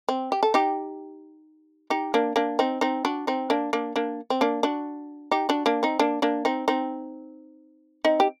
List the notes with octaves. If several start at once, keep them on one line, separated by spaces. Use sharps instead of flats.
C4
G4
A4
D#4 G4
D#4 G4
A#3 D4
A#3 D4
C4 D#4
C4 D#4
D4 F#4
C4 D#4
A#3 D4
A#3 D4
A#3 D4
C4
A#3 D4
D4 F#4
D#4 G4
D4 F#4
A#3 D4
C4 D#4
A#3 D4
A#3 D4
C4 D#4
C4 D#4
C4 D#4
G4